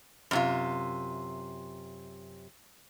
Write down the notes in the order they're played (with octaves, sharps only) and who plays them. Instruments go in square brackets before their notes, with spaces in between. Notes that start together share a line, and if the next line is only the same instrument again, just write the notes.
[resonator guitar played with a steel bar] F#2 C3 F4